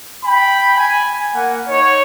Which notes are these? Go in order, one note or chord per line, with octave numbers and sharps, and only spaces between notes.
G5 B5
G#5
A#3 F#5
D#4 C#5